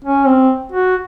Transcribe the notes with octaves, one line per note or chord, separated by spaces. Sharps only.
C#4
C4
F#4